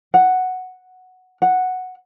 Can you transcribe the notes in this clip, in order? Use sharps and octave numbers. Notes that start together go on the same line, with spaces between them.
F#5
F#5